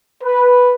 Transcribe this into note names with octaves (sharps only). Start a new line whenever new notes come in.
B4